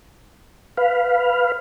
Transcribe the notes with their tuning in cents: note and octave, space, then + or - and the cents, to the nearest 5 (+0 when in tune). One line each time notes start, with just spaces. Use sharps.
B4 +0 F5 +0